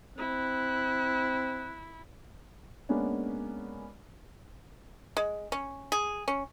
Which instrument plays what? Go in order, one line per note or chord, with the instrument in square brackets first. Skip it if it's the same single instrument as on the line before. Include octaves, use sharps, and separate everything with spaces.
[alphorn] C4 [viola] E4 [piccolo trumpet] F#6
[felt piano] G#3 A#3 B3 C#4 D4
[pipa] G#3
C#4
G#4
C#4